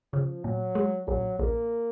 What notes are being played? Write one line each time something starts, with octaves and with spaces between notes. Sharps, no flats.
C#3 F3
A#2 F#3
G#3
A#1 F#3
A#1 A#3